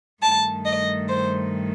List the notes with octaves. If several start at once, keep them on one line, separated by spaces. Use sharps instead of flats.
G2 D#3 A3 A5
D#5
C5